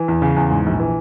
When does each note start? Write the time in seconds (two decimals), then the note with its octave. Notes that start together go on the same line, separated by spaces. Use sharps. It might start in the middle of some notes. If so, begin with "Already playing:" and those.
Already playing: E3
0.08 E2
0.22 C#3
0.36 E2
0.50 G#2
0.66 A#1
0.80 E3